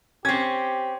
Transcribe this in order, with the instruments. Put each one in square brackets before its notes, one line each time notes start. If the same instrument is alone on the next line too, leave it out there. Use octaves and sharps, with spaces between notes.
[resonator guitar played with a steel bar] C4 C#4 [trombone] G4 [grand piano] G#6